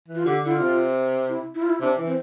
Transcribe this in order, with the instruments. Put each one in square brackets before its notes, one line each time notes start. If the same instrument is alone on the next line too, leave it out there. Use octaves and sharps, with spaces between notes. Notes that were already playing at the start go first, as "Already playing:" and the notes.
[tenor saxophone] E3
[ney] F4
[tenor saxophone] D3 [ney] G4
[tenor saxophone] D3 [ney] E4
[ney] F4
[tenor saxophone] C3
[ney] E4
E4
F4
E4
[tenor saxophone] C3 [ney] D4
[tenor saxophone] E3
[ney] C4